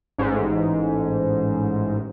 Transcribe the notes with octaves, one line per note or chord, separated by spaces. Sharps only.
A1 G#2